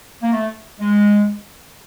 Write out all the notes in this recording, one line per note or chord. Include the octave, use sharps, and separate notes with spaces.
A#3
A3
G#3